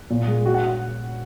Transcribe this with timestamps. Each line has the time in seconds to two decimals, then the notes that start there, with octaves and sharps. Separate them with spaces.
0.10 A#2
0.28 G#3
0.45 F#4
0.54 F#5